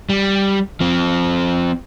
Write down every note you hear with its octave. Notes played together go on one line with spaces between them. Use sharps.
G3
F3 C4